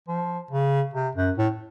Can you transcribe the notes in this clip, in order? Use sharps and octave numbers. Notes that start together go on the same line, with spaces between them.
F3
C#3
C3
F#2
A2